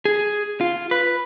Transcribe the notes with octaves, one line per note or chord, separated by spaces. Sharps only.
G#4
F4
B4